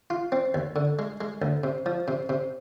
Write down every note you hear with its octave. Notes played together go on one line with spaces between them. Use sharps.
F4
C4
D#2
D3
G#3
G#3
D2
C3
F3
C3
C3